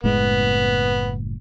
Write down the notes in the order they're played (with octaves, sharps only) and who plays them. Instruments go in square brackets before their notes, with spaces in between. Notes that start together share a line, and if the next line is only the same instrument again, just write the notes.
[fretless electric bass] F#1 A2 G#3 [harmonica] B3